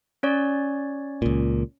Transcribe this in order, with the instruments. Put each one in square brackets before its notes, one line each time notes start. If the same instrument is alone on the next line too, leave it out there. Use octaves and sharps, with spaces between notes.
[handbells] C#4 C#5 D5
[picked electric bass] C#2 A#2